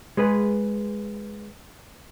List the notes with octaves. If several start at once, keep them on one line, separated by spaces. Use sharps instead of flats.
G#3 G#4 B4